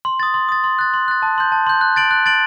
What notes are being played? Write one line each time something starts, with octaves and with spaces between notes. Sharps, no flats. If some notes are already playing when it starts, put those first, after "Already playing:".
C6
D#6 A6
C6
D#6 A6
C6
F#6 A6
C6
F#6 A6
A5
C6 G6
A5
C6 G6
F#6
A6 D7 F#7
F#6
A6 D7 F#7